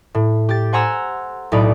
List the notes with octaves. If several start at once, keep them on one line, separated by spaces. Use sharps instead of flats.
A2
G4 A6
C5 F#5 G#5 A#5 C6 E6
B1 A2 D#4 B4 D5 D7